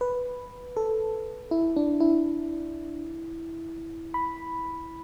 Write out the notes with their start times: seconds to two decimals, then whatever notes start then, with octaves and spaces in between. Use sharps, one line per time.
0.01 B4
0.77 A4
1.51 E4
1.76 D4
2.00 E4
4.14 B5